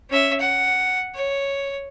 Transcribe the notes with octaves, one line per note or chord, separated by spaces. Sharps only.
C#4 E5
F#5
C#5